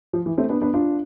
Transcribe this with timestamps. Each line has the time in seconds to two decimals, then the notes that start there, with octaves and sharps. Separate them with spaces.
0.13 F3
0.26 E3
0.38 A3 C4
0.49 B3 D4
0.62 B3 D4
0.74 D4 F4